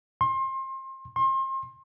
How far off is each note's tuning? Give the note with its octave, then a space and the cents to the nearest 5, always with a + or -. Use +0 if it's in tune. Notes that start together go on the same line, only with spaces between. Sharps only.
C6 +30
C6 +35